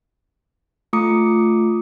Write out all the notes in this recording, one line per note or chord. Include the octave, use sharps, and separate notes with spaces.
A3 F4 A#5 D6 D#6 C#7